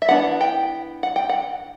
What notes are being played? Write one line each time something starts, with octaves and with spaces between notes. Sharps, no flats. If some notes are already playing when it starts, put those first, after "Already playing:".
E5
E3 B3 D4 F#5
G5
F#5
G5
F#5